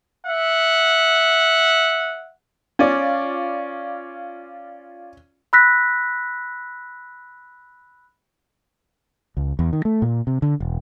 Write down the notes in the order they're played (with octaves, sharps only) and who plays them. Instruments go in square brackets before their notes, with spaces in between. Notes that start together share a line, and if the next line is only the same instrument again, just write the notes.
[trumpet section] E5 F#5
[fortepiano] C#4 [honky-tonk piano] F4 D5
[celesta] B5 E6 F#6 A#6 B6
[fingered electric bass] C#2
E2
D#3
A3
A#2
C3
D3
E1